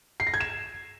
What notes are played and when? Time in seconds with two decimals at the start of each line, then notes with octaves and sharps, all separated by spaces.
0.20 C7
0.27 A#6
0.34 G#6
0.41 E7